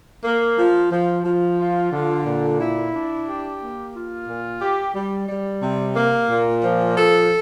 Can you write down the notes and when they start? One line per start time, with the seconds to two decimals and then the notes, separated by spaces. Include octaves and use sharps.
0.25 A#3
0.58 F3
0.91 F3
1.25 F3
1.59 F4
1.92 D3
2.25 A#2
2.59 E4
2.94 D4
3.27 G4
3.61 A#3
3.95 F4
4.28 A#2
4.62 G4
4.95 G3
5.29 G3
5.62 C3
5.96 A#3
6.29 A#2
6.63 F3
6.97 A4